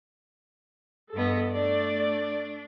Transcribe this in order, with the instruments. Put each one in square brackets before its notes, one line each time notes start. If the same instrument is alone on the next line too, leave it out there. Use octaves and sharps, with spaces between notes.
[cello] G2 B3 [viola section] A4 D#5
[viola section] A3 D5 [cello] D4